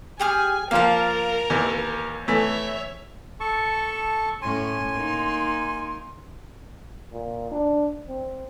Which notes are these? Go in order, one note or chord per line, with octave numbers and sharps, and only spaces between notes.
G4 G#4 G#5 F6
F3 A#3 A#4 F5 A5
D#2 E3
E3 A3 C#5 E5
A4 A5 C#6
A2 C#4 G#5 C6
A#3 D#4
A#2
D4
C4